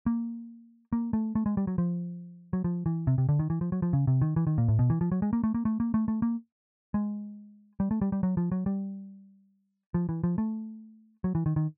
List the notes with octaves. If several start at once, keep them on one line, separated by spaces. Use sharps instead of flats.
A#3
A#3
A3
A3
G#3
G3
F#3
F3
F#3
F3
E3
C3
C3
D3
D#3
E3
F3
F#3
F3
C#3
C3
D#3
E3
D#3
A#2
A2
B2
E3
F3
F#3
G#3
A#3
A3
A#3
A3
A#3
A3
A3
A#3
G#3
G3
A3
G3
G3
F#3
F3
F#3
G3
F3
E3
F3
A3
F#3
E3
D#3
D#3